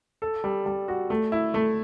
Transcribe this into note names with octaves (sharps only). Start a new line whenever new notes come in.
A4
G3
G3
F#4
A3
E4
A3